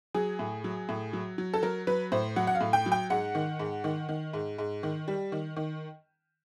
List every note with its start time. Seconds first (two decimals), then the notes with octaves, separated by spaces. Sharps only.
0.14 F#3 G#4
0.39 A2
0.64 F#3
0.89 A2
1.13 F#3
1.38 F#3
1.54 A4
1.63 F#3 A#4
1.87 F#3 B4
2.12 A2 C5
2.36 F#3 F#5
2.47 F#5
2.55 F5
2.61 A2
2.73 G5
2.86 F#3
2.92 G5
3.10 G#2 F#5
3.35 D#3
3.59 G#2
3.84 D#3
4.09 D#3
4.33 G#2
4.58 G#2
4.83 D#3
5.08 G3
5.32 D#3
5.56 D#3